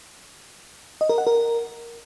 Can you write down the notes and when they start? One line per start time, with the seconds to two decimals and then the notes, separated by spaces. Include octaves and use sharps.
1.01 D#5
1.09 A#4
1.18 F#5
1.27 A#4